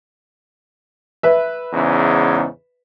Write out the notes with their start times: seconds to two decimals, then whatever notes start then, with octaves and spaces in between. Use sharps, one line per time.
1.23 B4 E5
1.73 E2 G#2 C#3